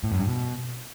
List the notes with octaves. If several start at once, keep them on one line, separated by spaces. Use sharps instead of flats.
A2
F#2
G2
B2